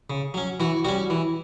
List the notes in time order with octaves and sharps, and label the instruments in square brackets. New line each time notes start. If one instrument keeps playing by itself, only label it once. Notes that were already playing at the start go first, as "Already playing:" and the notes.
[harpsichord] C#3
F#3 C#4
E3 F#4
G3 C#4 F#4
E3